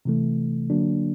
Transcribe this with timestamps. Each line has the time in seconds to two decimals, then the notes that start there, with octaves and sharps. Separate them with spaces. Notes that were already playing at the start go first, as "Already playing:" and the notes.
0.05 C3 E3 A3
0.70 D3 F#3 A#3 D4